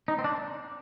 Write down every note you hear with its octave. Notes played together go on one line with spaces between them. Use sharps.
D#4
C4
D4